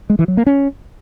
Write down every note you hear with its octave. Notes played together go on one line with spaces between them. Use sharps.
G#3
E3
F#3
A#3
C#4